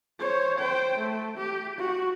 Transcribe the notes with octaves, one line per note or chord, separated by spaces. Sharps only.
C5 C#5
C5 G5
A3
G4
F#4